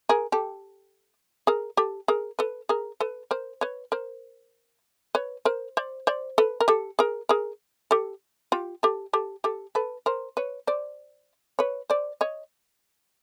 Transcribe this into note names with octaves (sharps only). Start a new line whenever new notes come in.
G#4 A#4
G4 A4
G#4 A#4
G4 A4
G#4 A#4
A4 B4
G#4 A#4
A4 B4
A#4 C5
B4 C#5
A#4 C5
B4 C#5
A#4 C5
C5 D5
C5 D5
A4 B4
A#4
G4 A4
G#4 A#4
G#4 A#4
G4 A4
F4 G4
G4 A4
G4 A4
G4 A4
A4 B4
A#4 C5
B4 C#5
C5 D5
B4 C#5
C5 D5
C#5 D#5